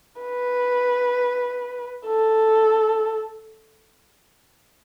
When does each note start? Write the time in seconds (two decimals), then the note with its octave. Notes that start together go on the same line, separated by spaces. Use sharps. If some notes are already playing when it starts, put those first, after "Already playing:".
0.22 B4
2.06 A4